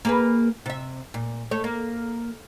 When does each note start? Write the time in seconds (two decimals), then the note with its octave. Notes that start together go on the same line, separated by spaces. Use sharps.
0.05 A#3 G#4 B4
0.66 C3 E5
1.14 A#2
1.51 A3 C#5
1.64 A#3